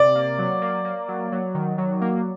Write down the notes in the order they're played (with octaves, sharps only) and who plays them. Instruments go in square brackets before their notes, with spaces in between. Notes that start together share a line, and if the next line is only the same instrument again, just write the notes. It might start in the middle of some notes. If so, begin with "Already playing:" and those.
Already playing: [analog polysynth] C3 [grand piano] D5
[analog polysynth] A#3
F#3
A#3
A#3
F#3
F#3
D#3
F#3
A#3